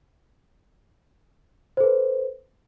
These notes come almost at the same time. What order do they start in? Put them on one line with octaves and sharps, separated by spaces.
C5 A4 B4